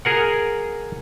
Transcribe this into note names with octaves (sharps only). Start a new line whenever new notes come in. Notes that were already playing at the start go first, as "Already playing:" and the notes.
G#4 A#4 F#5